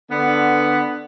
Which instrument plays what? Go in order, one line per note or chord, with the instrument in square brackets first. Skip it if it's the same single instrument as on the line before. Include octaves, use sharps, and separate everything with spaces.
[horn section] D3 B3